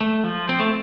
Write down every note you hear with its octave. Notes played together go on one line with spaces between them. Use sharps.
A3
F3
C4
A3